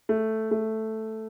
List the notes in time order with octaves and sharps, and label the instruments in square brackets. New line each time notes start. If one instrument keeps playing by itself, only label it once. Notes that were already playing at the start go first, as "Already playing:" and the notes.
[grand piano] A3
A3